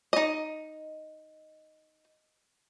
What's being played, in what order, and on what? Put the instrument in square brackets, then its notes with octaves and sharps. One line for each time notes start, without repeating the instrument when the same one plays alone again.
[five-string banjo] D#4 D#5